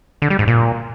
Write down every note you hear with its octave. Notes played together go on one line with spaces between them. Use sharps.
D3
G3
G#2
A#2